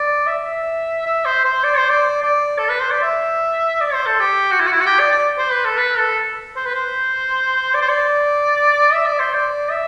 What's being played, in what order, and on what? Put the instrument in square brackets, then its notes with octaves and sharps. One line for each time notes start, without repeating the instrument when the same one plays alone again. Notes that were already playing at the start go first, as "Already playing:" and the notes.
Already playing: [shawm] D5
E5
E5
E5
C5
C5
D5
C5
D5
D5
A4
B4
C5
D5
E5
D5
C5
A4
G4
F#4
E4
F#4
E4
F#4
G4
D5
D5
C5
B4
A4
B4
A4
C5
B4
C5
D5
C5
D5
E5
D5
C5
D5
E5